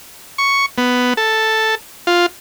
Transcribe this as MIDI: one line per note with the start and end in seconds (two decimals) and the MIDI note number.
0.38 0.66 85
0.78 1.14 59
1.17 1.75 69
2.07 2.26 65